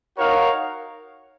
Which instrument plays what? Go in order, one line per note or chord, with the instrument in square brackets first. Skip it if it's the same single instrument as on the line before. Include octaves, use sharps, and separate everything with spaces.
[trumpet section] D#4 F#4 A#4 C#5 F5